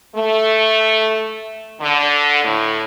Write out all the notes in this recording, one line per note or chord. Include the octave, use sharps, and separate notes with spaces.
A3
D3
A2